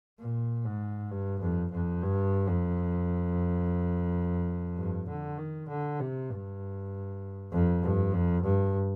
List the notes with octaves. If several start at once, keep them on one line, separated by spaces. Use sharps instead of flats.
A#2
G#2
G2
F2
F2
G2
F2
G2
D3
D#3
D3
C3
G2
F2
G2
F2
G2